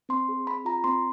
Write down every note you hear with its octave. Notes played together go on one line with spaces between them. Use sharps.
C4 C6
G#4
C4 B5
F4 A#5
C4 C6